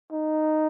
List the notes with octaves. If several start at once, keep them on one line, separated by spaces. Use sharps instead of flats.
D#4